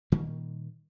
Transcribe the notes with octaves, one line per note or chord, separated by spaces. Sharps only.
A#2 D#3 G3 A#3